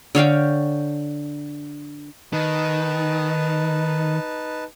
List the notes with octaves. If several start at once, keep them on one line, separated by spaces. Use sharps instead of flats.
D3 C#5 F5 G5
D#3 D#4 B4 A5